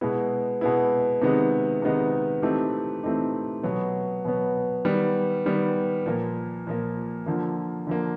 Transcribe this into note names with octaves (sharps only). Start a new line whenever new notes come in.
B2 G#3 B3 E4
B2 G#3 B3 E4
C3 D#3 G#3 B3 D#4
C3 D#3 G#3 B3 D#4
E3 A3 C4 D#4 G4
E3 A3 C4 D#4 G4
B2 F#3 B3
B2 F#3 B3
D#3 G3 B3
D#3 G3 B3
A#2 F3 A#3
A#2 F3 A#3
D3 F3 A#3
D3 F3 A#3